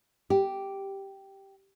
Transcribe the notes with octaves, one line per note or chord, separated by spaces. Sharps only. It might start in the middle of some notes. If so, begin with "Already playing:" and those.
G4